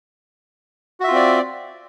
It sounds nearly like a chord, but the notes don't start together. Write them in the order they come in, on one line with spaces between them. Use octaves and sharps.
F#4 E5 F4 C4 D5